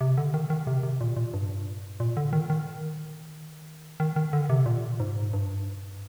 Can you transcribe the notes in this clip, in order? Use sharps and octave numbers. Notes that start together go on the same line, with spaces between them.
C3
D3
D#3
D#3
C3
C3
A#2
A#2
G2
A#2
D3
D#3
D#3
D#3
D#3
D3
C3
A#2
G#2
G2